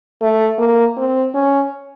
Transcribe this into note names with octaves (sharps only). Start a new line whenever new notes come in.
A3
A#3
C4
C#4